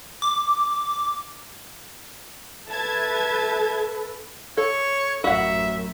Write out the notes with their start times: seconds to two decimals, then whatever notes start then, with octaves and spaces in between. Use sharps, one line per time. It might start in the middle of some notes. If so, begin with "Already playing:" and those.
0.22 D6
2.70 A4 B4 E5 A5 G#6
4.57 A4 C#5
5.24 A1 F#2 F#4 E5 F#5